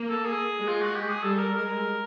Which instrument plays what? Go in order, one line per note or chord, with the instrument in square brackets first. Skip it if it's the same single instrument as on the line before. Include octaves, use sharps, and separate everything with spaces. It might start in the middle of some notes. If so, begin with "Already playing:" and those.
Already playing: [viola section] A#3
[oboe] A4
G#4
[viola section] G#3
[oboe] F4
F#4
G4
G#4
[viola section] G3 [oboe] A4
[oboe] A4
A#4
[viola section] G#3 [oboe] A#4